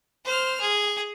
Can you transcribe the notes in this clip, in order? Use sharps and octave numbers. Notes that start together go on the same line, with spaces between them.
C5 F6
G#4